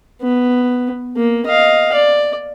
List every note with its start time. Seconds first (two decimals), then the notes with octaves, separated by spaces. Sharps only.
0.22 B3
1.16 A#3
1.46 D#5 F5
1.93 D5